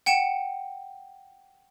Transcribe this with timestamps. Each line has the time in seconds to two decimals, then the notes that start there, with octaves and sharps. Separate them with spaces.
0.06 F#5 G5 C#7 E7